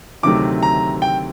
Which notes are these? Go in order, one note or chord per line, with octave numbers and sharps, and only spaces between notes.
D2 C3 D#3 F#3 A3 D6
A#5
G5